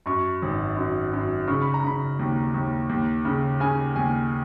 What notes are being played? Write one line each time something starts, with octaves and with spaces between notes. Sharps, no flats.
F#2 C#6
G#1
F#2
F#2
C#3 C#6
B5
A#5
C#3 B5
D#2
D#2
D#2
C#3
C#3 G#5
D#2 G#5